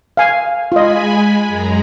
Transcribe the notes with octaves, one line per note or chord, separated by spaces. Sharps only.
F5 G#5
G#3 F4 D#5 G#5 B5
F#2 G#3 A#5